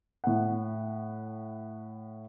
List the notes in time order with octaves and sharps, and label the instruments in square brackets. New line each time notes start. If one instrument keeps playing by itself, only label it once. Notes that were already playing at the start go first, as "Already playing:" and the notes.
[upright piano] A2 F#5